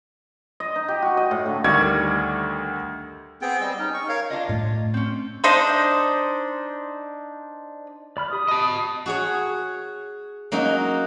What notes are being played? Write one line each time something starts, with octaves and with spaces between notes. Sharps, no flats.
D#5
D#4
G4
F#4
D#5
A2
D3
D2 D#3 G3 C#6 D6 G#6
B3 C4 G#4 G5
G3 D#5 E6
C#4 D#4
C#6
A#4 C#5 F5
D4 F4 D#5
A2 A3 F4
C4 C#4
D4 D#4 C5
D5 B5 F6
G4 D5 D#6
D#5 A5 B5
F#4 G#4 C#5
F#3 A#3 C#4 D#4